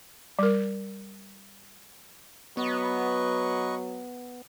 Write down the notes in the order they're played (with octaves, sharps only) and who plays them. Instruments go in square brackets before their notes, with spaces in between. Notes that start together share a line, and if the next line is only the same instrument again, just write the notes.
[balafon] G3 A#4
[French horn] F#3 [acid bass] B3 [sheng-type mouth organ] B4 D#5 C#6